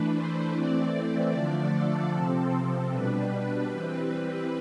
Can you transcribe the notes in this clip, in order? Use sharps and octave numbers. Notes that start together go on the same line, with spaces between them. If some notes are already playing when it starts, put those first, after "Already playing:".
Already playing: E3 A3 D4 B4
C5
E3 A3 C4 D5
D3 F3 A3 D4 D5
A4
C3 F3 C4 A4
A4
B2 G3 D4 B4
B4
E3 G3 C4
B4